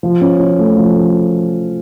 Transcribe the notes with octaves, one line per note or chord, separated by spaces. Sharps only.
F3
C#4
C#4
A3
F3
F3